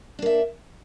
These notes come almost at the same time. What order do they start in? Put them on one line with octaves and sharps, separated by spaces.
D4 A#3 E5